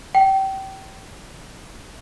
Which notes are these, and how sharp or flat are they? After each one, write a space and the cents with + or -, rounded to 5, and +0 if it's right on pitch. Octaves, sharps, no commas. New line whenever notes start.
G5 -25